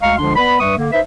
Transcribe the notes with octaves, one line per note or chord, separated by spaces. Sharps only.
D2 G#3 D#5 F5 A#5 C#6
C#2 D3 F3 D4 C6
B3 B4 D5 B5
G2 G3 B4 E5 C#6 D#6
D3 A#3
D#4 B4 C5 E5